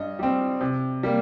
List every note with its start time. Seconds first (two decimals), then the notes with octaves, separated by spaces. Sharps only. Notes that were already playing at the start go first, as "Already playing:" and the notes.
Already playing: G2 D#5
0.19 G3 C4
0.61 C3
1.03 G3 A#3